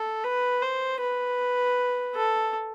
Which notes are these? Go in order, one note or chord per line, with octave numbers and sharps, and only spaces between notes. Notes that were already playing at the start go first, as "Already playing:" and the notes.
Already playing: A4
B4
C5
B4
A4